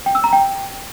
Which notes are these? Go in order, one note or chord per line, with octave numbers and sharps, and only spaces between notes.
G5
E6
A#5
G5